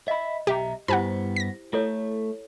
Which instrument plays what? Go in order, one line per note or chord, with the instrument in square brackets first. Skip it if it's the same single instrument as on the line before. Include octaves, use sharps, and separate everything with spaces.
[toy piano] D#5 [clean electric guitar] E5 B5
[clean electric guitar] B1 E5 A#5 [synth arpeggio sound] G4
[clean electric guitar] G2 B3 [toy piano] E4 G4 C5 [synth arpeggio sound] F#5 G#5 B5
[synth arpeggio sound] A#6 B6
[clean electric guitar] A3 [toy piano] E4 A4 C#5